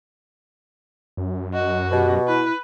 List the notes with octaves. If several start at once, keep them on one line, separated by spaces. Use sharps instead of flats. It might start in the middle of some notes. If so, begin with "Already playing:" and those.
F#2
F#4 D#5
B2 G4
E4 B4